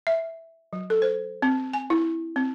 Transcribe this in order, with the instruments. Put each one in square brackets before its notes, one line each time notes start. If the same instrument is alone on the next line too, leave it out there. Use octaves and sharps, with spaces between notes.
[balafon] E5
F#3
A4
C5
C4
G#5
E4
C4